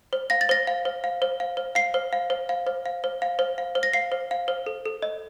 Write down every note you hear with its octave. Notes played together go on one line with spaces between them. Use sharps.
C5
F5 A#6
A6
C5 A#6
F5
C5
F5
C5
F5
C5
F5 C7
C5
F5
C5
F5
C5
F5
C5
F5
C5
F5
C5
A#6
F5 C7
C5
F5
C5
A4
A4
D#5